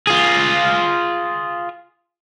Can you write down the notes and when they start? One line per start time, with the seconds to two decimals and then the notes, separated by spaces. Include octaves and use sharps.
0.07 F4 G#4